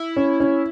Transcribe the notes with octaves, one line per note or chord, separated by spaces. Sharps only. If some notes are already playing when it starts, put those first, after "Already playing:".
Already playing: E4
C#4
C#4